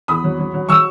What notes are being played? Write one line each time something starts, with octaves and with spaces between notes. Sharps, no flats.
E2 B5 D#6
F#3
F#3
F#3
F#3 C#6 E6